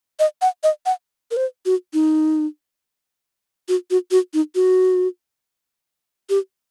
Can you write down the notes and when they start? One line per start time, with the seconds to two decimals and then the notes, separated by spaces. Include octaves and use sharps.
0.20 D#5
0.42 F#5
0.63 D#5
0.86 F#5
1.31 A#4
1.37 C5
1.66 F#4
1.93 D#4
3.69 F#4
3.91 F#4
4.11 F#4
4.34 D#4
4.55 F#4
6.30 G4